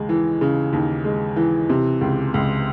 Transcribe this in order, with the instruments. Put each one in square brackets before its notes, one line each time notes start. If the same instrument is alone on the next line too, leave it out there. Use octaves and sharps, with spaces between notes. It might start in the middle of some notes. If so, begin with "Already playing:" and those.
Already playing: [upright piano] D#2 C#3 G#3
E3
C#3
D#2
G#3
E3
C3
C#2
C#2